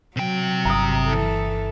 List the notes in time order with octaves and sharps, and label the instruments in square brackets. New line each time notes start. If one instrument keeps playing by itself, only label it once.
[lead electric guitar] C3 G5 [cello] F#3
[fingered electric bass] G1 [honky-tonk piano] A#5 D#6
[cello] E3 A4